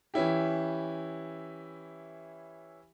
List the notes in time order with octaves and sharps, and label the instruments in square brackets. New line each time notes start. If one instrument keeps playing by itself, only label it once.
[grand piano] E3 C#4 E4 G4